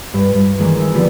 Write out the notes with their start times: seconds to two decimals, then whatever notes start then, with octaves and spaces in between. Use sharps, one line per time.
0.14 G2 B6
0.34 G2
0.58 D#3 E3 G#3 A#3
0.79 E5
0.94 D3 F3 A#3 B3 G4